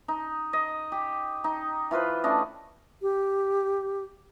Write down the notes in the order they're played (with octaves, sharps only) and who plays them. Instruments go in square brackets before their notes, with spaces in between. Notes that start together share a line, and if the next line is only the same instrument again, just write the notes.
[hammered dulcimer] D#4
D#5
G4
D#4
E3 F4 B4 C5
A3 C#4 D4 D#5
[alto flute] G4